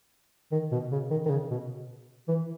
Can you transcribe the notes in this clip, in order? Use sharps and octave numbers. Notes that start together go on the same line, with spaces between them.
D#3
B2
C#3
D#3
D#3
C#3
B2
E3